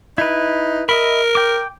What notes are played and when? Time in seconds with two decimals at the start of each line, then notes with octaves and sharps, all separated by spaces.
0.18 D#4 E4 B4
0.89 A#4 D#5 E5 B5
1.35 G5 D6